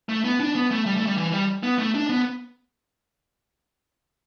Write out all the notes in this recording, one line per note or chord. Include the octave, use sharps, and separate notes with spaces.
A3
B3
D4
B3
A3
G3
A3
G3
E3
G3
B3
A3
D4
B3